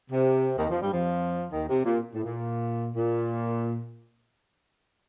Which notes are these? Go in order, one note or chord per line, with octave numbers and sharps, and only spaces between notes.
C3
D#2 D#3
F2 F3
G2 G3
F2 F3
D#2 D#3
C3
A#2
A2
A#2
A#2